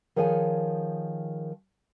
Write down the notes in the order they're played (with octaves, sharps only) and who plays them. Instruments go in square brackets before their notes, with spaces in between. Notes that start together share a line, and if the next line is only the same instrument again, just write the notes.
[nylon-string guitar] D#3 F3 G#4 C#5 F#5 G#5